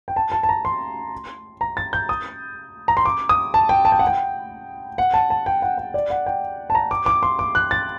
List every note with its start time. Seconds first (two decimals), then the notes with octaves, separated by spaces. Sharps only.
0.08 G5
0.16 A5
0.32 A5
0.43 A5
0.49 A#5
0.65 C6
1.61 A#5
1.77 A6
1.93 G6
2.09 D#6
2.88 A#5
2.97 C6
3.05 D6
3.29 D#6
3.54 A5
3.69 G5
3.85 A5
3.92 G5
3.99 F#5
4.07 G5
4.98 F#5
5.14 A5
5.30 A5
5.46 G5
5.62 F#5
5.78 F#5
5.94 D5
6.10 F#5
6.26 G5
6.70 A5
6.75 A#5
6.91 D6
7.06 D6
7.23 C6
7.39 D6
7.55 F#6
7.71 A6